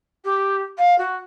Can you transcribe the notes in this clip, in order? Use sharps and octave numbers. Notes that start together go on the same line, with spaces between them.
G4
F5
F#4